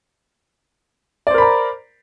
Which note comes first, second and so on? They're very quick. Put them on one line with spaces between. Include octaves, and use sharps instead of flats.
D5 C5 A#4 B5 A#5